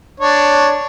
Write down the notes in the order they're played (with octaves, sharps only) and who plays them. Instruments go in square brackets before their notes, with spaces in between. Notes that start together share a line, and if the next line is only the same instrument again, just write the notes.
[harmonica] D4 C#5